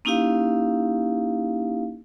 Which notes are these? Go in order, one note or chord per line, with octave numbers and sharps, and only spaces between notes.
A#3 C#4 D#4 E4 G4 F5